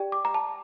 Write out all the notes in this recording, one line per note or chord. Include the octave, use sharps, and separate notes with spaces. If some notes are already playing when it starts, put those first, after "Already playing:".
Already playing: G4 D5 G5
D6
A#5
A5